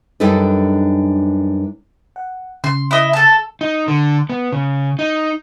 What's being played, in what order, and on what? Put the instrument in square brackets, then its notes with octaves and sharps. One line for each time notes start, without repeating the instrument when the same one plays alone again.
[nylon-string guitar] F#2 G3 D4 D#4 A4 B4
[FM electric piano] F#5
[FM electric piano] C#3 [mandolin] C6
[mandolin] E4 D#5
A4 A5
[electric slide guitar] D#4
D3
B3
C#3
D#4